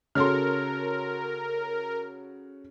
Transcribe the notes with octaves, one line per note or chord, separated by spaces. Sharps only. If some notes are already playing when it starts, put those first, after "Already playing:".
C#3 F#4 A4 A#4 C#5 C6 F6